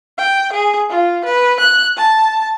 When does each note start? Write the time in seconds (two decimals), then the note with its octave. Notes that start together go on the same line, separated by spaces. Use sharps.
0.18 G5
0.52 G#4
0.90 F4
1.25 B4
1.60 F#6
1.97 A5